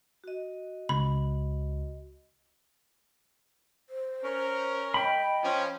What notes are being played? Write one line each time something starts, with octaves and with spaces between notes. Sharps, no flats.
F#4 D#5
C#2 B5
C5
C#4 A#4
D#5 G5 B5
F3 C#4